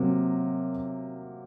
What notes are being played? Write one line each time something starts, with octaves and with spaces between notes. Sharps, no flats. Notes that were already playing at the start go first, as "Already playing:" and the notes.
Already playing: C3 F#3 A#3